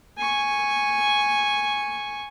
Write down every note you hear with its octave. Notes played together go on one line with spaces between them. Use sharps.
G#5 C#6